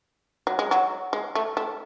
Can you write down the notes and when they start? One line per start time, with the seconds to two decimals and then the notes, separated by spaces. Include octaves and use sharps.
0.47 F#3
0.59 G#3
0.71 F#3
1.13 G#3
1.35 A3
1.57 A3